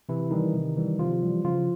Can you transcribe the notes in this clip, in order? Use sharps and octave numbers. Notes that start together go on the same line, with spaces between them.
C3 E3 E4
D#3 E3 G3 D#4
C3
E3 G3
C3 F3 F4
E3 G3
C#3 F3 F4